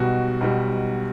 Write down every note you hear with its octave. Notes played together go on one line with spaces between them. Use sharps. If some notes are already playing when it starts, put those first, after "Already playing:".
Already playing: B1 B2 G3 F#4
B1 B2 G3